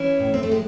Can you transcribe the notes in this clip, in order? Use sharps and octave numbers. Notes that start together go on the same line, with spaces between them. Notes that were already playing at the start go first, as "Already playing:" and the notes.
Already playing: E3 C#4 E4
A2
C4
A3
A2 G#3